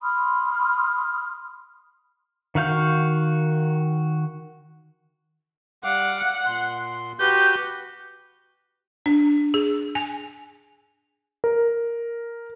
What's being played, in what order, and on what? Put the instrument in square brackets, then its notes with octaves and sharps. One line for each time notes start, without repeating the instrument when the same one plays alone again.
[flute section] B5 C6 D#6 F6
[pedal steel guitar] D#3 F#4 F5 G6
[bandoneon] G3 F5 D6 [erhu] F#5
[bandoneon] A#2 C6
[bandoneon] F#4 G4 B4 [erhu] G6
[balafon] D4
G#4
G#5
[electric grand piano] A#4